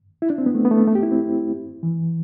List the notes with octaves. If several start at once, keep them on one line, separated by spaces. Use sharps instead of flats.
E4
D4
C4
B3
A3
B3
A3
A3
G4
E4
C4
E3